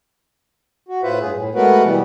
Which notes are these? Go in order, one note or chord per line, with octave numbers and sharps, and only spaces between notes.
F#4
A2 F4 B4 C5 E5
G2 G#4
A2
G#3 A3 B3 F#4 A#4 B4
B2 E3 G3